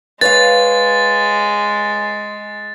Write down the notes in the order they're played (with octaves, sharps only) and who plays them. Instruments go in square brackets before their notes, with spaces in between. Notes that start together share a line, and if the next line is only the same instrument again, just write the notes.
[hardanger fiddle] G#3 [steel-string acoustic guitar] B4 C#5 F5 [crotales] A6